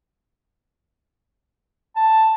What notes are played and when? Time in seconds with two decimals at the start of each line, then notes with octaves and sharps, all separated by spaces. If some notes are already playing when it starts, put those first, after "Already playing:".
1.96 A5